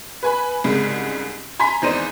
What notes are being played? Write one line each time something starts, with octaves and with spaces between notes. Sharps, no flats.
B4 G#5 B5
C2 G#2 C#3
G#5 A#5 C6 B6
G#1 E2 D#4 C5 D5 D#7